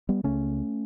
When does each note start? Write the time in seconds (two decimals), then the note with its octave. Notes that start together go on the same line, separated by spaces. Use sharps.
0.09 G3 B3
0.24 C#2 C#3 A3 C#4